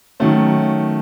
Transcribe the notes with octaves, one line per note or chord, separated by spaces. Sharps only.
D#3 F#3 A3 C#4